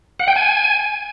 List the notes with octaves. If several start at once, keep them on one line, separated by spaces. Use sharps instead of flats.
F#5
G5
G#5